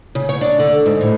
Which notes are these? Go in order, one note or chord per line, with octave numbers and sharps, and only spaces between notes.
C#3
C#5
D4
D3
G#2
A2